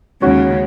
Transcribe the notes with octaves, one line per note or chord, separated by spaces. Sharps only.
D#2 C#3 G#3 C#4 F#4